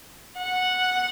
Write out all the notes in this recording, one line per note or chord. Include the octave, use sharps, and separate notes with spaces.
F#5